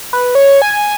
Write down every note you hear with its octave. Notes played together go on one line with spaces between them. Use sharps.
B4
C#5
G#5